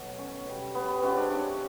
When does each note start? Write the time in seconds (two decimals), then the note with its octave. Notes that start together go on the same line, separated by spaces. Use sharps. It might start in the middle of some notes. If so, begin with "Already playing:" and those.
Already playing: B2 F#3 A3
0.19 C#4
0.46 B2 G3
0.75 B3
0.88 B3
1.02 C3 F3 G#3 C#4
1.17 D4
1.31 C#4